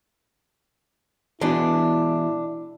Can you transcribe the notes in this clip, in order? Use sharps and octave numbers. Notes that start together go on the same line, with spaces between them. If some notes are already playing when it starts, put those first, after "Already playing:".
B2 E3 G#3 D4 E4